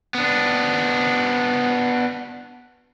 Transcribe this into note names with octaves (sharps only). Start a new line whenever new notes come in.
B3 D4